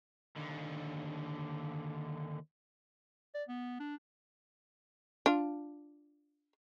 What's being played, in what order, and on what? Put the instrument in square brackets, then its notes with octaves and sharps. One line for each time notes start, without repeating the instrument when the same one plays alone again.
[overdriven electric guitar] D#2 D3
[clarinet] D5
B3
D4
[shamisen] D4 F4